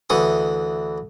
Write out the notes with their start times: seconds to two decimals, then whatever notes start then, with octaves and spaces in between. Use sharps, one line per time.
0.10 D2 E3 C#6 D#6